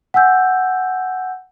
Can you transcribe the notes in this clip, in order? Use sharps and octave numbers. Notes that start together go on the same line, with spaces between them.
F#5 G#5 E6 G6